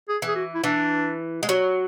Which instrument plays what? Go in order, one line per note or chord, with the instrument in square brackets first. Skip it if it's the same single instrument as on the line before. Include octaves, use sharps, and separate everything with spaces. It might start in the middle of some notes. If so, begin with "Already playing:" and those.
[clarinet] G#4
[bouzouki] E3
[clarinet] G#4
F#4
E4
[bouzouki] E3 [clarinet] D4
[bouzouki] G#3
F#3